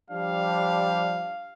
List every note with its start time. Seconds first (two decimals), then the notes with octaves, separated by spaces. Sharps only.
0.10 F3 G3 D4 F5